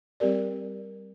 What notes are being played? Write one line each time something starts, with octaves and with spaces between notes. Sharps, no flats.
G3 C4 G4 A#4 D5